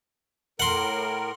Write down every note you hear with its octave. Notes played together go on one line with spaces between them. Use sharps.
A2 A#4 F#5 C6